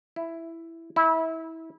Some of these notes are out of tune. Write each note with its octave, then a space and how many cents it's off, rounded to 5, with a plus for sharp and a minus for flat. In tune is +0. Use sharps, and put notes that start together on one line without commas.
E4 +5
E4 -25